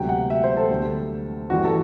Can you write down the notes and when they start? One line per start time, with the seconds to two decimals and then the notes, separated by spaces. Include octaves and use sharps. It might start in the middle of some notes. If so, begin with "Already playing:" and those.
Already playing: E1 D2 C3 F#3 G5
0.09 F#5
0.30 E5
0.44 C5
0.57 A4
0.70 D2 D3 G3
1.50 A1 G2 E3 G3 F#4
1.64 A4